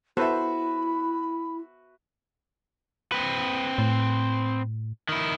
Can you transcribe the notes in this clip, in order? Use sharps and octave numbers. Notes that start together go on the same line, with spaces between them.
B3 E4 F#4 A4 B4 C5 E5 B5
C4 B4
A2
D#3 E4